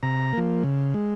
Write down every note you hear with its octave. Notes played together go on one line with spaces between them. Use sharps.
C3 A#5
F3 A#3
C#3
G#3